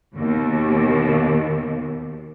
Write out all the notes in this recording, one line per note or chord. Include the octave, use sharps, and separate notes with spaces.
D#2 B2